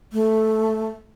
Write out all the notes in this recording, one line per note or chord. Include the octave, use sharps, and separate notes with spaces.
A3